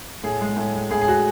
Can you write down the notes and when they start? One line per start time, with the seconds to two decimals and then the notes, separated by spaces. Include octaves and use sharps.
0.24 A2 G#4
0.41 G#3
0.57 A2
0.74 G#3
0.91 A2 G#4
1.01 G#4
1.07 G#3 F#4